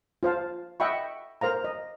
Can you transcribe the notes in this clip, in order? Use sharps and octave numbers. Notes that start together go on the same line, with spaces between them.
F4 C5 F5 A5
D#5 E5 F#5 G5 B5 C#6
A#4 C5 F5 A#5
D#5